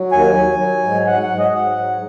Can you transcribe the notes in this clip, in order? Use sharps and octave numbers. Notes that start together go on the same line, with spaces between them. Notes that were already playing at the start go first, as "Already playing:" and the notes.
Already playing: F#3
D#2 G#5
F#3
F#3
G#2
F#3 F#5
F#5
G#2
D#5
G#2 F#5
F#3